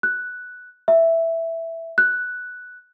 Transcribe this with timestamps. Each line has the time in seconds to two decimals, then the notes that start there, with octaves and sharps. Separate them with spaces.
0.03 F#6
0.88 E5
1.98 F#6